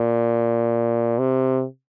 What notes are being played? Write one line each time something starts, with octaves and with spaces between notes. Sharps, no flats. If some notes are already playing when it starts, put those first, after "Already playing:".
Already playing: A#2
C3